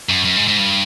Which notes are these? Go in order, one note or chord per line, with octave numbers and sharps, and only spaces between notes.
F#2
F#2
G#2
G#2
G2